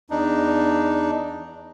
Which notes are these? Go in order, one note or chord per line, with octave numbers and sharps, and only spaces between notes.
E2 D4 D#4